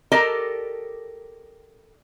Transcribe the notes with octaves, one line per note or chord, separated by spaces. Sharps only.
G4 A4 A#4 D5 D#5 A5